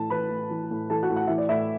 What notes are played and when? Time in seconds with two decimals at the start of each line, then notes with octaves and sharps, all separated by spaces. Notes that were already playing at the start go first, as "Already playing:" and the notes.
Already playing: A2 E3 A5
0.10 E3 B4 B5
0.31 A2
0.51 E3
0.71 A2
0.90 E3 A4 A5
1.03 F#4 F#5
1.10 A2
1.16 F#5
1.27 E3 E5
1.38 D5
1.49 A2 E4 E5